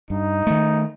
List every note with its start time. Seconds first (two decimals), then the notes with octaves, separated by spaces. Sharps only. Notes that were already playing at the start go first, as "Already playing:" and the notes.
0.10 G2 D#4
0.47 D#3 A3